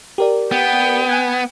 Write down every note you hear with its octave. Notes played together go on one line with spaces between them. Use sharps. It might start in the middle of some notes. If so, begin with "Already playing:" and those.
G4 A#4 D5
B3 G5
G#5 F#6 G#6